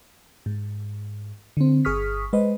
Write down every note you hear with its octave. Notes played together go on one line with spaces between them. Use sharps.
G#2
D3 C4
G1 G#4 C#6 D#6 F6 B6
G#3 B4 C5 D#5